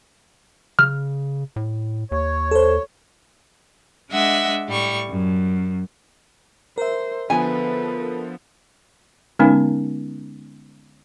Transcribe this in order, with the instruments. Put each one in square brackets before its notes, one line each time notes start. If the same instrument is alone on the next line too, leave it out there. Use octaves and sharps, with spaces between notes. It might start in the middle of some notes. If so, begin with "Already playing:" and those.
[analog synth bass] C#3 [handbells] F6
[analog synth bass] A2
[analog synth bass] D#2 [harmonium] C#5
[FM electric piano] A4 C5
[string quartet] G#3 D4 D#5 E5 F#5
A2 G3 C#6
F#2
[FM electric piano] A#4 E5 [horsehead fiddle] C5
[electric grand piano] D3 F3 B3 [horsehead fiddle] A4 B4 [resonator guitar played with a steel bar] G#5
[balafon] D3 G#3 B3 C#4 D#4